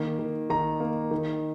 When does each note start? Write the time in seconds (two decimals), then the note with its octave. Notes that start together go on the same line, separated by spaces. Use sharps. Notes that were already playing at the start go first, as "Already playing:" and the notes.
Already playing: D#3 A#3
0.19 D#3
0.50 D#3 A#5
0.80 A#3
1.11 D#3